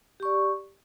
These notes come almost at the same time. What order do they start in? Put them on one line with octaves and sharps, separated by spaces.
G4 C#6 D5